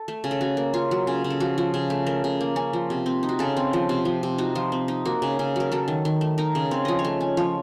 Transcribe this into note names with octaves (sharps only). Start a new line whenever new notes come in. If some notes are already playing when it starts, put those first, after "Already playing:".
Already playing: A4
A3
C#3
A4
C#4 F#4
A#3
C#4 F4
F#3
C#3
C#3
A4
F3 F#4
F3
C#3
A3
A3 A#4
C#3
A#3
C#4
F3
C3
C4
D#4
F#4
C#3 A4
C4
F3
C3
F3
C3
D#4 F#4
F3 F4
C4
D#4
A#3 F#4
C#3
C#3
F#3 A#4
F#3 A4
D#3
D#3
A3
D#4 A#4
C#3
C4 C#5
F3 D#5
C#5
A3
C#4
F3 C#5